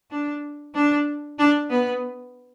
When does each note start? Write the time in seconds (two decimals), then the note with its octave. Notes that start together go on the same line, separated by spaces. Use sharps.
0.11 D4
0.74 D4
1.39 D4
1.70 B3